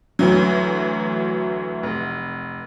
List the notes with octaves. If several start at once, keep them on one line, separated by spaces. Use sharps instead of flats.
D2 E3 F#3
F1